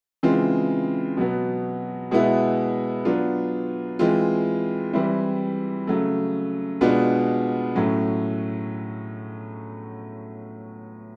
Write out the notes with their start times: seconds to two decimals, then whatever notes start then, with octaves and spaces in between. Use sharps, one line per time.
0.23 C#3 E3 G#3 C4 F4
1.17 B2 F#3 B3
2.11 B2 G#3 B3 E4
3.05 F#3 B3 D4 F4
3.99 E3 G#3 C4 F4
4.93 E3 G3 C4 E4
5.87 C#3 F#3 A3
6.81 B2 G#3 B3 D4 F4
7.75 A2 F#3 A3 C#4